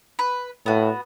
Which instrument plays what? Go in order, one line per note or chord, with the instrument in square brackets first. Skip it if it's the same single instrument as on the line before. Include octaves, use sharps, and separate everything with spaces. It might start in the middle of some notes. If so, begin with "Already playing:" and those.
[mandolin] B4
[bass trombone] A2 [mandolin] B3 F#4